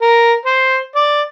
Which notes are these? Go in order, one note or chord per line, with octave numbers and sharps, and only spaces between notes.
A#4
C5
D5